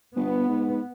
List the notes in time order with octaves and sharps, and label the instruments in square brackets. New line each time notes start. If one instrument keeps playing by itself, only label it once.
[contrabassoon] G1 [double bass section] B3
[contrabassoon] G#2